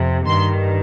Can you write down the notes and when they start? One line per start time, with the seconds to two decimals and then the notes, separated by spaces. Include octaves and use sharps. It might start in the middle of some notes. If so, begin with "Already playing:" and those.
Already playing: F2 C3
0.26 G2 D#3 C6